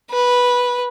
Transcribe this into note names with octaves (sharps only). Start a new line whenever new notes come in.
B4